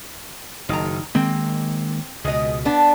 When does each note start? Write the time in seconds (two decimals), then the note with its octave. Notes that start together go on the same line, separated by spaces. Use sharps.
0.69 F#1 D#3 A#5
1.15 D#3 G#3 A#3 C4
2.24 C#2 B2 G#3 D#5
2.65 B3 D4